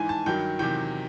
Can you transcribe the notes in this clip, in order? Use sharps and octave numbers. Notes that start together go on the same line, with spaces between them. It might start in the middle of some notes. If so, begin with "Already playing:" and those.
Already playing: G#2 E3 G#5
A5
G2 D#3 F#3 G5
E2 C3 D#3 F#3 G5